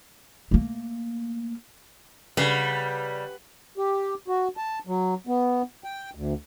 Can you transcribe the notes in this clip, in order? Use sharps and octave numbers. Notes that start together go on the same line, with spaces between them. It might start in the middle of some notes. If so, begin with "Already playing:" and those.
A3 A#3
C#3 G3 B4 F#5
G4
F#4
A5
F#3
B3
G5
D2